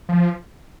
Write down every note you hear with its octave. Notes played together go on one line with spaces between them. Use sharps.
F3